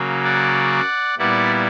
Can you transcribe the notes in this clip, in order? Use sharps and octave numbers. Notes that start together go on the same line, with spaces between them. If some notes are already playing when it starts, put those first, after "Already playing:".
Already playing: C#3 F#3 A#3
D5 F#5
A#2 G3 B3 E4 D5 F#5